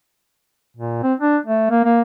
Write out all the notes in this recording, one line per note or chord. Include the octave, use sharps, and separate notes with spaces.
A#2
C4
D4
A3
A#3
A#3